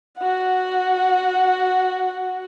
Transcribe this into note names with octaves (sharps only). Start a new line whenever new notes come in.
F#4 F#5